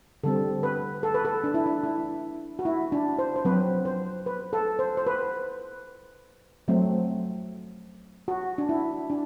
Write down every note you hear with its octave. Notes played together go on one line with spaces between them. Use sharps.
D3 G3 C4 A4
B4
A4
B4
A4
D4
E4
D4
E4
F#4
E4
D4
C5
C5
F#3 C4 B4
C5
B4
A4
C5
C5
B4
F#3 A3 C4
F#4
D4
E4
D4